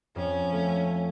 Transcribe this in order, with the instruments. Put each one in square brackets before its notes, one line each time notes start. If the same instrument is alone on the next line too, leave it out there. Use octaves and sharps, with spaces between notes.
[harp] F2 [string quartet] C#4
[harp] A3